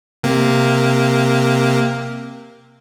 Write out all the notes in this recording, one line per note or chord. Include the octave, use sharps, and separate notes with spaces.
C3 A#3